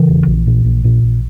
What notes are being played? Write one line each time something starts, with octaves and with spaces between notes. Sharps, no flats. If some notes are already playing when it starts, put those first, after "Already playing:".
Already playing: C#3 E3
E1
A#1
A#2
A#1
A#2
A#1